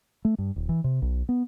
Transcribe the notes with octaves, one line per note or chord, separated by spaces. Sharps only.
A3
G2
D#1
E3
C3
B1
B3